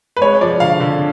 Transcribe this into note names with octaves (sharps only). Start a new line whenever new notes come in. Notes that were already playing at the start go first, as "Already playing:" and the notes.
B4
G#3 C#5
F3 D5
D3 F5
D3